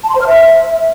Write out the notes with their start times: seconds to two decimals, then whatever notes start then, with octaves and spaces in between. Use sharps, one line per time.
0.04 A5
0.10 C6
0.15 C5
0.21 F6
0.27 E5